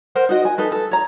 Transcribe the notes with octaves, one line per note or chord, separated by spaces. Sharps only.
A#4 C5 F#5
D#4 F#4 D#5
G#5
D#4 A4 B4
A4
C#5 A#5